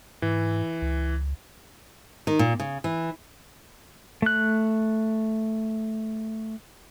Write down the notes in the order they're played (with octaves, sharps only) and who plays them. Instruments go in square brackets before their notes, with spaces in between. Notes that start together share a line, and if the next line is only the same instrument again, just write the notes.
[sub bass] G#2 [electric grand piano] E3
[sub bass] C#2
[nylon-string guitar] D#3
A#2
C#3
E3
[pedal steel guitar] A3 F#6